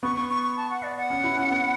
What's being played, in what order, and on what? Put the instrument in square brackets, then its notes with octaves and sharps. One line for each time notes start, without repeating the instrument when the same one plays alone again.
[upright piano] B3 [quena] C#6
[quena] C#6
C#6
C#6
A5
F#5
D5
F#5
[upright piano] C#4
E4
C#4
B3